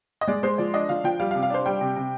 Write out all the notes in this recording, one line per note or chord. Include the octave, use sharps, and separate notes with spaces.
D#5
G#3 D5
G#3 C5
F3 D5
D4 D#5
F3 F5
F3 G5
G3 F5
F5
C3
F5
D4 C5
G3 G5
C3
C3